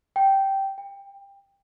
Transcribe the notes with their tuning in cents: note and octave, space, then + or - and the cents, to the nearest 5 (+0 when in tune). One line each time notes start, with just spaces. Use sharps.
G5 -10
G5 +20